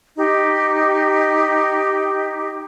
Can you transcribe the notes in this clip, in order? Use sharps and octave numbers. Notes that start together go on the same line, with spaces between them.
D#4 G4